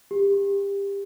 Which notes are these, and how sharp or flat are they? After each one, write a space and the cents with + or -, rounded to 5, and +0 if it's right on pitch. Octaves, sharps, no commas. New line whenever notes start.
G4 +25